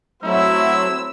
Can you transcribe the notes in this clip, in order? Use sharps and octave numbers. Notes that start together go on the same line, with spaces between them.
F#3 A3 C4 E4 E6